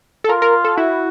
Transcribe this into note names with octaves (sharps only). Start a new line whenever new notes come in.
A4
F4 A#4
A#4
A4
E4 F#4